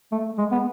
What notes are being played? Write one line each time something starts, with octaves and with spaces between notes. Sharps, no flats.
A3
G#3
B3